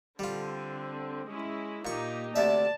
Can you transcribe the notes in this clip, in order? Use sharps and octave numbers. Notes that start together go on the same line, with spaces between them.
D3 G3 C4 F4
G#3 C#4 E4
A#2 A#3 D#4 G4 C#6
D2 C3 D5 E5 A5